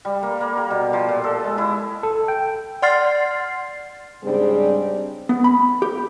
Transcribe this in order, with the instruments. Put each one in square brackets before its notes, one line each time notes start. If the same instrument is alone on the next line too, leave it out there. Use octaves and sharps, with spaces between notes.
[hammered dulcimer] G3
A#3
A#3
G4
B2
F3
A#2
A4
G#3
E4
[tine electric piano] A4
G5
[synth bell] D5 F#5 C6 F6 A6 C7
[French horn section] G#2 C#3 G3 C4 D4 G#4
[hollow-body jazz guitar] B3
B5
G4